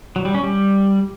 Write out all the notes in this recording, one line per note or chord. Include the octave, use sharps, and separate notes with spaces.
F#3
G3
C#4
G3